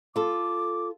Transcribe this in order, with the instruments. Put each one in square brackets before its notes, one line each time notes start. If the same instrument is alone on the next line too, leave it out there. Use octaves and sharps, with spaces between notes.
[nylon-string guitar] F4 A4 [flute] D6